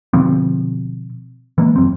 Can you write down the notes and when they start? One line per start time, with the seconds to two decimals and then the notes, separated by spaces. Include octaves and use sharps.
0.13 B2 D3 F3 C4
1.58 E3 G#3 A#3
1.76 F1 F#2 C4